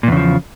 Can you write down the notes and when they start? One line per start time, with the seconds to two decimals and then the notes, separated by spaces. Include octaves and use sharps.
0.03 A#2
0.08 E2
0.12 C#3
0.17 F3